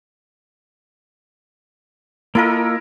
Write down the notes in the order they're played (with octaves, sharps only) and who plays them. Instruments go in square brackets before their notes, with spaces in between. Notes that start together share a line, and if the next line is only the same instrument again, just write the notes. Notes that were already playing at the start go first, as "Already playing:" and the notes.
[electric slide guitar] A#3 F4 D#5 [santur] E4 A4 A#4